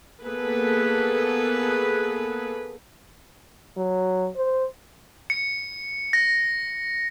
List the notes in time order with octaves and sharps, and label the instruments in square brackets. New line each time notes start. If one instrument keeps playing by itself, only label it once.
[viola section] A#3 B3 G#4 A4 B4
[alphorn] F#3
C5
[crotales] C#7
A#6